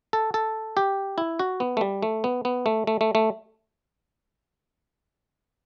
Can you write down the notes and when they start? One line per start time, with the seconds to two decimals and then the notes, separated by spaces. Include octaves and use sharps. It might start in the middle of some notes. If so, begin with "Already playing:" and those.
0.13 A4
0.34 A4
0.77 G4
1.18 E4
1.39 F#4
1.60 B3
1.77 A3
1.81 G3
2.03 A3
2.24 B3
2.45 B3
2.66 A3
2.87 A3
3.01 A3
3.15 A3